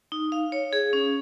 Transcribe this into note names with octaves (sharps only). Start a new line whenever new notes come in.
D#4
F5
C#5
G#4
C#4